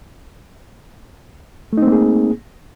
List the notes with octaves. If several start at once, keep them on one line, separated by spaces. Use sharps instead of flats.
A3 A#3 C4 D#4 G#4